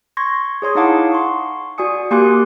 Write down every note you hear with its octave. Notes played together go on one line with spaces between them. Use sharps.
C6 C#6 G#6 A#6
G#4 C#5 C6 D#6
D#4 E4 F5 F#5 A5 D6
C6 C#6
F#4 D5 G#5 D#6 C#7
A#3 G4 G#5 C6 D6 F#6